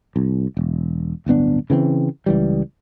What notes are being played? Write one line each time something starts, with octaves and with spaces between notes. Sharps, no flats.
C2
E1
D1 G1 B3 D4
C#3 E3 F#3 C4
C#2 E3 G3